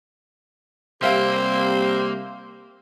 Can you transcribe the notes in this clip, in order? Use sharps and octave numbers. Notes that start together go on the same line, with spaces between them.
C3 G3 A#3 C4 G4 E5 F5